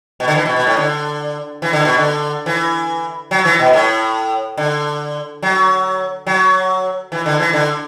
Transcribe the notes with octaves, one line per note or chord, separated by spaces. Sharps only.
B2
D3
E3
B2
B2
A2
D3
E3
D3
B2
D3
E3
F#3
E3
B2
A2
D3
F#3
F#3
E3
D3
E3
D3